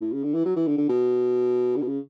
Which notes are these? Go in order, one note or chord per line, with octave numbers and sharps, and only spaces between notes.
A2
C#3
D3
E3
F#3
E3
D3
D3
B2
D3
B2
C#3